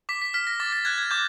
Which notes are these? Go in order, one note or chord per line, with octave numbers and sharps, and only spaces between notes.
D6 B6
B6
F6 B6
A#6
D6 A6
A6
F#6 G#6
G#6
D6 G6